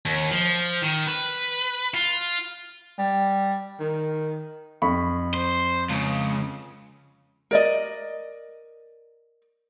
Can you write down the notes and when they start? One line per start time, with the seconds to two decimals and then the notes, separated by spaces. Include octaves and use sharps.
0.05 D#2
0.31 F3
0.82 D#3
1.07 B4
1.94 F4
2.99 G3
3.80 D#3
4.82 F2 B5 C#6
5.34 C5
5.90 C#2 C#3
7.51 A#4 D5 D#5